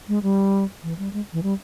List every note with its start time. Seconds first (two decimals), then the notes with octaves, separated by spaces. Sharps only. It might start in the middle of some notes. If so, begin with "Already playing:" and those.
0.08 G#3
0.23 G3
0.83 E3
0.99 G3
1.13 G#3
1.33 E3
1.43 G3